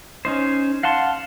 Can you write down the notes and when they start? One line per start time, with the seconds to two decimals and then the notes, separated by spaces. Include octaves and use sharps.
0.25 C#4 D#4 C5
0.83 F5 F#5 A5 C6